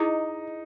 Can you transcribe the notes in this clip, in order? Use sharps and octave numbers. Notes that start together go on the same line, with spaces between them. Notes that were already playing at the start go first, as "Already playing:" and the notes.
Already playing: D#4 E4 G#4 D#5